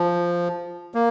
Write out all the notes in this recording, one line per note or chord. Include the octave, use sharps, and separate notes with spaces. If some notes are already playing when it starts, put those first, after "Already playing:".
Already playing: F3
A#3